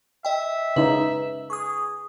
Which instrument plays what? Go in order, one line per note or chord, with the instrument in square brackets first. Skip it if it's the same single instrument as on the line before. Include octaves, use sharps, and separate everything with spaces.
[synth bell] D#5 G5 [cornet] E5
[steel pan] C#3 D#4 [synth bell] B4
[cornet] G#4 [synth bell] C#6 D#6